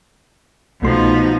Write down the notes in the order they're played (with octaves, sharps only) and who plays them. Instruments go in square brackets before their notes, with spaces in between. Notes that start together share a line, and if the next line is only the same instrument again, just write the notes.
[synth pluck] C2 A3 C6 [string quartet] B2 F3 D#4